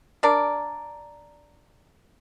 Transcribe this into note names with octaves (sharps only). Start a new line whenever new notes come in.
D4 A#4 D5